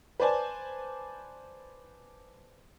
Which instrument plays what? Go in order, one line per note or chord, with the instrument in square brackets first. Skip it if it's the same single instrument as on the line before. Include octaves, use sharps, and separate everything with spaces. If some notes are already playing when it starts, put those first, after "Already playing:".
[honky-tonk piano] B4 C5 D5 G#5 A5